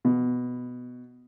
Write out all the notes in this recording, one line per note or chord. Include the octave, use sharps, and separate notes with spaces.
B2